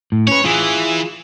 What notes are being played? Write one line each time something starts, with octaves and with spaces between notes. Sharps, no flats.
A2
C#4 B4 C#5
E3 F4 G#4